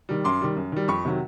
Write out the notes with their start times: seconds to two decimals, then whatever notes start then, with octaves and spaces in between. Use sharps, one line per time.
0.09 D#3 G3
0.24 F#2 C6 D6
0.41 D#3 G3
0.56 F#2
0.72 D#3 G3
0.88 F2 B5 C#6
1.05 C3 D#3 F#3